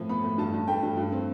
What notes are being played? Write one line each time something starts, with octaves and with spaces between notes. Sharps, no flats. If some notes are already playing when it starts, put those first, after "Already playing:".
Already playing: A2 F3 C4
B3 B5
A2
G2 A5
G2
A3 G5
G2
G2
C4